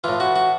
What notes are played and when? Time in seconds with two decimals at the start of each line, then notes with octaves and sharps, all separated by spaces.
0.04 A2 E3 F4
0.20 F#4
0.36 F#4